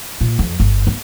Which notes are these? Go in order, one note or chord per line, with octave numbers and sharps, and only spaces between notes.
A#2
F2
G1
B3